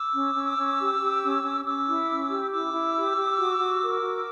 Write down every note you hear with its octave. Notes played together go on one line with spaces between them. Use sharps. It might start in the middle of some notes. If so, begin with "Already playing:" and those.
Already playing: D6 E6
C#4
C#4
C#4
G4
G4
C#4
C#4
C#4 D6 E6
E4
C#4
G4
E4 D6 E6
E4
G4
G4
F#4
F#4
A#4
F#4